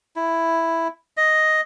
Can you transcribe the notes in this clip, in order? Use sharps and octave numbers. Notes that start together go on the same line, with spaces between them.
E4
D#5